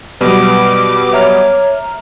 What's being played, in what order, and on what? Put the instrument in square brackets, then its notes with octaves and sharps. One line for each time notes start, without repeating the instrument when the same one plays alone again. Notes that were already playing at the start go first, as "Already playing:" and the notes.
[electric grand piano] B2 G3 B3 [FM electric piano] F#3 B4 [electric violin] D6
[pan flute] C#5 [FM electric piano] E5 A#5 F6